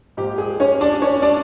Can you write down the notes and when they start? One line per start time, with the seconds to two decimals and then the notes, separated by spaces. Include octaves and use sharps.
0.17 G#2 F3 A#3 G4
0.38 G#4
0.60 C#4 C#5
0.81 D4 D5
1.02 C#4 C#5
1.22 D4 D5